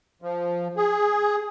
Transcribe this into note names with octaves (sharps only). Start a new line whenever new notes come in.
F3
G#4